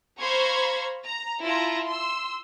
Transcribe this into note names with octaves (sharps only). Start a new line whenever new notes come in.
C5 F5 A#5 B5 C#6 G#6
A#5
E4 F4 A5 A#5
C6 E6